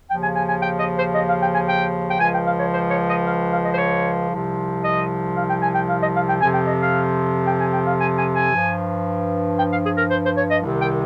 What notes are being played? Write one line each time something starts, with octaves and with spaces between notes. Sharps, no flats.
D#2 C#3 F3 G5
G#5
G#5
G#5
G5
D#5
C5
D#5
F5
G5
G#5
G5
G5
C#2 C#3 F3 G#5
G5
F5
C#5
C5
C#5
D#5
F5
F5
D#5
C5
C#5
C2 C3 F3
D#5
F5
G5
G#5
G5
F5
D#5
F5
G5
F2 C3 F3 G#5
G5
D#5
F5
G5
G#5
G5
F5
G#5
G#5
G#5
G2 F3
G5
F5
G#4
A#4
C5
C5
C#5
D#5
C2 C3 D#3
G5